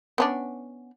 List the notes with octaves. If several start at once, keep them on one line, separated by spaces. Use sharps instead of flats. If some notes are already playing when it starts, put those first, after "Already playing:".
B3 C#4 D4